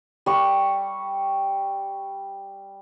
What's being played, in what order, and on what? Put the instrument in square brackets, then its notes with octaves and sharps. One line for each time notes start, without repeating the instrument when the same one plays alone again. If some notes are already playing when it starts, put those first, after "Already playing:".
[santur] G3 C#6